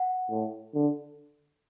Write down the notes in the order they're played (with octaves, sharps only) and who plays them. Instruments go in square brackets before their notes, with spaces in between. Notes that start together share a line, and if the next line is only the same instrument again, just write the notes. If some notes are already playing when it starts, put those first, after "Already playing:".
Already playing: [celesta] F#5
[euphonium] A2
D3